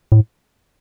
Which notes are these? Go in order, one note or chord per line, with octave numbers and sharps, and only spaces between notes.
A2